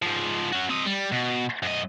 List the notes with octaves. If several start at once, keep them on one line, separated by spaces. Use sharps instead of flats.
G#2 F3
C#4 F#4
C4 D#5
G3
B2
F#2 D#5